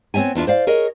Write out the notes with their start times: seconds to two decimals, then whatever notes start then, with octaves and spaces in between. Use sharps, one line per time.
0.14 B3 C4 C#5 E5 G#5
0.35 E2 D4 F4 E5
0.47 C5 D5 F5
0.67 G#4 A#4 C#5 D#5